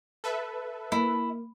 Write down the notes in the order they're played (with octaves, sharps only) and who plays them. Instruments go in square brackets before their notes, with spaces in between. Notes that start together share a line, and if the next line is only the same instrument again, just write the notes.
[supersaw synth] A4 B4 E5
[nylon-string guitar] A#3 [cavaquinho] E4